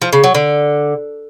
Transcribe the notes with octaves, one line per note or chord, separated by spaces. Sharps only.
F3
C#3
F#3
D3